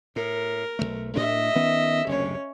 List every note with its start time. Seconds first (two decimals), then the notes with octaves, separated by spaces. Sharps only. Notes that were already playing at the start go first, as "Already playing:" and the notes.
0.16 A2 A#4
0.79 B1 F2 A3
1.16 A2 D4 D#5 E5
1.55 D#3 B3 C#4
2.07 F#1 D2 C3 C#4 C#5